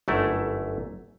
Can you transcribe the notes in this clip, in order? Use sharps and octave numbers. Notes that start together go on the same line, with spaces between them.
G1 F#2 A3 E4